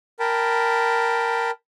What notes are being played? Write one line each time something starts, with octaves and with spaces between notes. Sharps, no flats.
A#4 G5 A5 B5